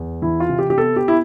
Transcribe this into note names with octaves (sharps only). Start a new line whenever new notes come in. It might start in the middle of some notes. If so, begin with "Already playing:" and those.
Already playing: E2
E3 E4
F4
C3
G4
G4
B3 A4
G4
E4